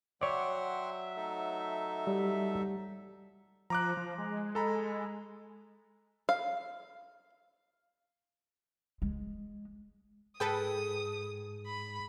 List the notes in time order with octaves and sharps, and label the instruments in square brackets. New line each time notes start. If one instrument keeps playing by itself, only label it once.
[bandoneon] F#3 E5 [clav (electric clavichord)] C#5 D5 [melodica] F#5 G5 C6
[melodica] A3 D#4 A4
[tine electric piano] G3
[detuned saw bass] F3 [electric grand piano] A#5 D6 F#6
[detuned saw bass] F3
G#3
[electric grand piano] A4 A#5 B5
[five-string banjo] F5
[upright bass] G#3
[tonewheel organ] G#2 [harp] G#4 [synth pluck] A4 B4 G5 [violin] D#6
[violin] B5